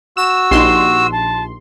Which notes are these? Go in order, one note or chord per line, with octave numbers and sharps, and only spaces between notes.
F#4 E6 E7
A#1 D#4 G4 C6 E7
A5